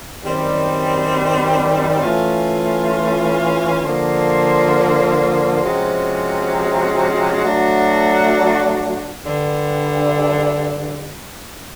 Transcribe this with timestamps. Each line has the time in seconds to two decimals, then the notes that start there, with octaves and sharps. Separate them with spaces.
0.21 F#2 D#3 G3 C4
2.01 E3 A3 C#4 F4
3.82 D3 F3 A#3
5.62 C3 F3 G#3 C#4 F#4
7.42 F#3 A3 D4 F#4
9.23 G2 D3